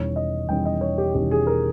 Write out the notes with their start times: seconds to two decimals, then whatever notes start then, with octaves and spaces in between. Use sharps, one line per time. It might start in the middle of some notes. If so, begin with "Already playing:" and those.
Already playing: E1 E2 D#3 G3 C#4 C#5
0.16 D#5
0.48 E1 E2 D#3 G3 C#4 G5
0.65 D#5
0.81 C#5
0.98 G4
1.14 E1 E2 D#3 G3 C#4 G4
1.31 G#4
1.47 A#4